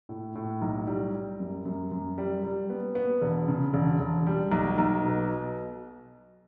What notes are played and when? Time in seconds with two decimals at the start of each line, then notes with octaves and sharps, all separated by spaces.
0.09 A2
0.35 A2
0.62 B1
0.87 G3
1.13 G3
1.40 F#2
1.65 F#2
1.92 F#2
2.18 G3
2.44 G3
2.70 B3
2.95 B3
3.21 E1
3.48 C#3
3.73 E1
4.00 E1
4.27 G3
4.52 B1
4.78 B1
5.05 B2